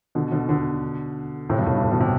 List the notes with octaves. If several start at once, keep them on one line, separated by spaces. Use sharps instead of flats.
B2 D3
B2 D3
B2 D3
A2 C3
G2 B2
A2
G2
A2
G2 B2
A2 C3